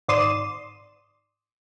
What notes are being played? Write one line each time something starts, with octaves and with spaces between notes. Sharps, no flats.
G#1 D5 C6 D#6 E7